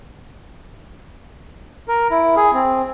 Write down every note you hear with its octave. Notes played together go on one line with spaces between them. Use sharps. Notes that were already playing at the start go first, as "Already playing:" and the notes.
A#4
E4
G#4
C4